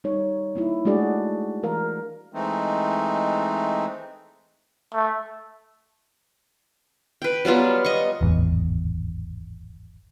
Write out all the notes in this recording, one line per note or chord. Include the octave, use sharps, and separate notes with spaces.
G3 D#4 C#5
A#3 D#4 E4
G#3 A3 D4 F#4 G#4 D5
E3 A#4 F5
E3 G#3 A3 C4 D#4
A3
B4 G5
F#3 G3 B3 F4
D#5 C#6
D1 G#1 E2